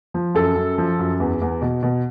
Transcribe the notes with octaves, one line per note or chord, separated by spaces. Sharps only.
F3
F#2 A4
F#2
F3
F#2
E2
E2
B2
B2